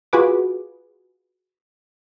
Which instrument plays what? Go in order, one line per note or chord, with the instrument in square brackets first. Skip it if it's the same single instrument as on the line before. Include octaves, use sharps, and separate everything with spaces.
[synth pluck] F4 F#4 G#4 B4 D6